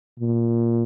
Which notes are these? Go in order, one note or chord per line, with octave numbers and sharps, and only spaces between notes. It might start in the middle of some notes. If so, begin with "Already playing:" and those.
A#2